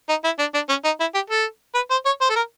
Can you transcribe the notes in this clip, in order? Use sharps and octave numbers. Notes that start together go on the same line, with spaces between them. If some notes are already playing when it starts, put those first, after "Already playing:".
D#4
E4
D4
D4
C#4
D#4
E4
G4
A4
B4
C5
C#5
C5
A4
A#4